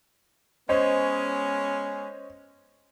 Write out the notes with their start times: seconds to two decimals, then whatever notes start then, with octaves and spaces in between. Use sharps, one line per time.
0.69 G#3 B3 C#4 C5 C#5 D#5